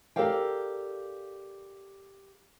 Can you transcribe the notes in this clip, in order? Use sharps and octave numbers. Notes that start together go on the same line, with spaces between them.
G4 A4 A#4 D5 F5 G5